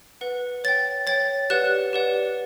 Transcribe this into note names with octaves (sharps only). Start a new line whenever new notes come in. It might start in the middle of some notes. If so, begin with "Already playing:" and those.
B4 F#5
C#5 G5 A6
C#5 G5 A6
G4 B4 D5 F#5 F#6
G4 B4 D5 F#5